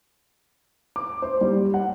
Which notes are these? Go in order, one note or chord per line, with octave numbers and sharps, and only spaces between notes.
D6
C5
G3
F#5